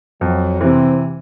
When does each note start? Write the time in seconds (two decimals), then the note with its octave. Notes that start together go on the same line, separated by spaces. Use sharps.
0.21 F2 F#3
0.60 C3 E3 C4